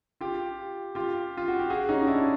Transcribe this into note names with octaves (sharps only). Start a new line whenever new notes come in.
F4 G4
F4 G4
F4
F#4
G4
F#4 G#4
C#4 D#4
D4 E4